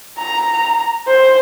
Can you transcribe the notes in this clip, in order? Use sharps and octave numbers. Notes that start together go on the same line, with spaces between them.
A#5
C5